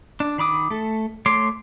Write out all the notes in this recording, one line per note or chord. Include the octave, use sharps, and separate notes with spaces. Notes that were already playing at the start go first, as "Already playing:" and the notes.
D4
D#3 B5 D6 D#6
A3 A4
A3 C#5 C6 D6